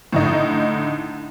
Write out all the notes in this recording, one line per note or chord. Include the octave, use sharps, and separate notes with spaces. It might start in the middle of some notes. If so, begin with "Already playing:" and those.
A2 D3 D#4